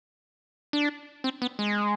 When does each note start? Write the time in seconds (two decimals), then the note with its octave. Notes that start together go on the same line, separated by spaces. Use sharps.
0.73 D4
1.24 C4
1.42 B3
1.59 G#3